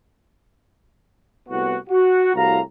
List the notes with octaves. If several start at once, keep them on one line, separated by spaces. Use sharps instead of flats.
C2 A2 B3 F#4
F#4
C2 A2 F#4 F5 A#5